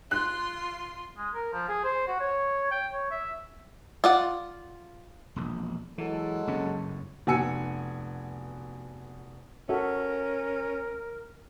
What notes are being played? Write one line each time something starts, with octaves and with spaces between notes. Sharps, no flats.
F4 C6 F#6
G#3
A#4
F3
G#4
C5
F#4
C#5
G5
C#5
E5
F4 D5 F#5
E1 A#1
E3 F#3 G#3 A4
F#1 G2 C#4
F1 B2 F#4 G#5 E6 C#7
C#4 F#4 A4 A#4 E5